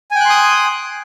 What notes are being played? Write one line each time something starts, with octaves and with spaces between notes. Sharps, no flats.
G5 G#5 C6 D#6 F#6